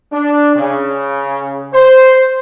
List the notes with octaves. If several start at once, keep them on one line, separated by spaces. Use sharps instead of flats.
D4
C#3
C5